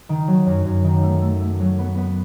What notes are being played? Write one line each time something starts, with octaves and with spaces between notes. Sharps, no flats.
D#3
F#3
F#2
F#2
D#3
A3
A3
A3
F#3
B3
B3